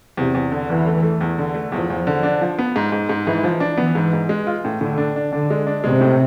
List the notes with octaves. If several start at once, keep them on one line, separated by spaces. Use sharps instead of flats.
E2 C3
E2
D3
E2 E3
A3
A3
E2
D3
A3
E2 F3
E2
D3
D4
F3
B3
G#2
G#2
G#2
G#2 E3
F3
D4
E3 B3
G#2
G#2
G#3
F4
A2
A2 D3
D4
D4
D3 D4
G#3
D4
C3 G#3
A2